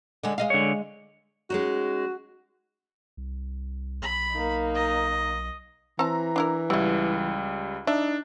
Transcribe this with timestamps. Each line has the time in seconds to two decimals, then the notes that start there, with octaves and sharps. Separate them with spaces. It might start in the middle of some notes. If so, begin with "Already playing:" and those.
0.24 D3 G#3
0.38 G#3 D#5 F5
0.50 D3 C#5
1.50 G#3 C#4 D#4 F#4
3.17 C2
4.02 B1 B5
4.33 A#3 D#4
4.75 D#5
5.99 E3 C4 A5 A#5
6.36 D4 E4 A#4
6.70 C#2 F#3 G3 E4
7.87 D4 D#4 E5